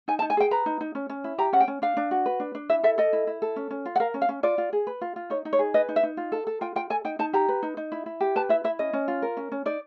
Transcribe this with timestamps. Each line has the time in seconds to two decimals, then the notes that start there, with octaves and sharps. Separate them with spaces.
0.08 D#4 G#5
0.19 A5
0.22 D#4
0.30 G#5
0.37 G#4 G5
0.51 B4 A#5
0.66 D#4
0.81 D#4
0.95 C#4
1.09 C#4
1.24 E4
1.38 G4 A#5
1.53 C#4 F#5
1.60 G5
1.68 C#4
1.82 D4 F5
1.97 D4
2.11 F#4
2.26 B4
2.40 D4
2.55 D4
2.69 E4 E5
2.83 A4 E5
2.98 A4 D#5
3.13 E4
3.27 E4
3.42 A4
3.56 C#4
3.71 C#4
3.85 F4
3.96 F#5
4.00 A#4 F5
4.14 C#4
4.22 F5
4.29 C#4
4.43 F4 D5
4.58 F4
4.73 G#4
4.87 B4
5.01 F4
5.16 F4
5.30 D#4 C#5
5.45 D#4
5.53 C#5
5.59 G#4
5.74 B4 D#5
5.89 D#4
5.96 E5
6.03 D#4
6.17 F4
6.32 A4
6.47 A4
6.61 F4 G5
6.76 F4 G5
6.90 A4 G#5
7.05 D#4 G5
7.19 D#4 A5
7.33 G4 A#5
7.49 B4
7.63 D#4
7.77 D#4
7.92 E4
8.06 E4
8.21 G4
8.36 B4 A5
8.49 E4 E5
8.64 E4 E5
8.79 C#4 D#5
8.93 C#4
9.08 F4
9.22 A#4
9.37 C#4
9.52 C#4
9.66 D#4 D5